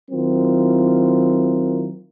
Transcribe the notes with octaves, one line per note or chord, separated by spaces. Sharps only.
D#3 F#3 C4 E4 F4 A#4